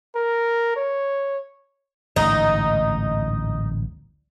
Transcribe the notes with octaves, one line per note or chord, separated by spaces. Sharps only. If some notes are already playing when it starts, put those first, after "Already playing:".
A#4
C#5
D1 A1 G#2 D#4